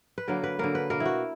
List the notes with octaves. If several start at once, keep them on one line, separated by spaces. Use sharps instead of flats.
B4
D3 F#3 A#3 A#4
B4
D3 F#3 A#3 A#4
B4
B2 A#3 A#4
E4
F#4